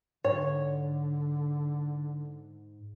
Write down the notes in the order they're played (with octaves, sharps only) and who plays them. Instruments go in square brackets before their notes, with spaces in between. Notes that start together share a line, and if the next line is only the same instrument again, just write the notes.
[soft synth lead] G#2 [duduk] D3 [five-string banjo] C#5